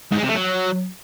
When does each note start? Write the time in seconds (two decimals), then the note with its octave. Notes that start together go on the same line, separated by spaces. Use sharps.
0.11 G#2
0.17 G#3
0.23 C3
0.29 A3
0.34 F#3